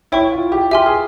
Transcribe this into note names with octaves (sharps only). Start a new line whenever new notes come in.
E4 C#5 G5 C#6
F4
G4
G4 E5 G#5 C6 F6
G#4